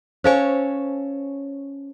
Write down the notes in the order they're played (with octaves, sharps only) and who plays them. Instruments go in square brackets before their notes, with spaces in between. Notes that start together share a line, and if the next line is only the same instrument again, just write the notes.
[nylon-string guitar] C#4 A4 C#5 [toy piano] C5 F5 G#5